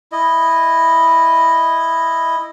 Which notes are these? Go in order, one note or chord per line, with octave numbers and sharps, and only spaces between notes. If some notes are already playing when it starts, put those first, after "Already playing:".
E4 D#5